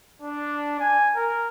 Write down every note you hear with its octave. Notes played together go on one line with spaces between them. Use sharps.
D4
G#5
A#4